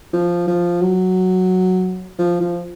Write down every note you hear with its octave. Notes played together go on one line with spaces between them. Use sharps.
F3
F3
F#3
F3
F3